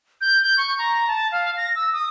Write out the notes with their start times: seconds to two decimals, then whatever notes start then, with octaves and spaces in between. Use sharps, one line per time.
0.21 G6
0.44 G6
0.58 C#6
0.78 A#5
1.08 A5
1.32 F5
1.57 A#6
1.76 E6
1.93 D#6